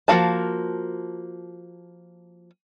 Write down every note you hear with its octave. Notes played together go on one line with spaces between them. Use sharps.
F3 A#3 F#4 F5 A5